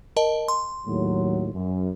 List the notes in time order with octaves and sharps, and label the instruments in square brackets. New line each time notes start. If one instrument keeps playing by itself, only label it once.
[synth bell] A#4 D#5 A5
C6
[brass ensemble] D#2 A2 F#3
F#2